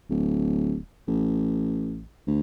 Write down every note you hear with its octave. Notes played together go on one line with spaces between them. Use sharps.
D1
A1
D2